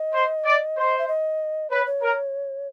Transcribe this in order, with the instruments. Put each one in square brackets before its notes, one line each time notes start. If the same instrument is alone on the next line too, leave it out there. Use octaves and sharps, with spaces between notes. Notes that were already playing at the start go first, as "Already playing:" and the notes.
Already playing: [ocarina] D#5
[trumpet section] C5
D5
C5
[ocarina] E5
D#5
[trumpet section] B4 [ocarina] C#5
[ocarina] C#5
[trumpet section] A#4